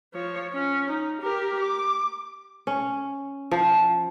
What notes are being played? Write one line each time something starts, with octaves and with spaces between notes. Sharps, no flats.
F3 C#5
C#4
D#4
G4 A#4
D6
C#4
F3